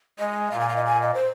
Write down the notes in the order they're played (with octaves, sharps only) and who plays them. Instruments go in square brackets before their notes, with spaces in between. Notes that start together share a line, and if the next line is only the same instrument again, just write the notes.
[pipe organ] G#3 [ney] D#5
[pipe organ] A#2 [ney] F5
[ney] G#5
F5
D#5
G#5
D#5
C5